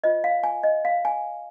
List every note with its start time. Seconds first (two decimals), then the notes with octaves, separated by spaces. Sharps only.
0.03 F4 C5 D#5
0.24 F5
0.43 G#5
0.63 D#5
0.85 F5
1.05 G#5